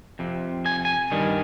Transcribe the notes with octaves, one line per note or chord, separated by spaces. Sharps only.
F2 C3
G#5
G#5
G2 D#3 G3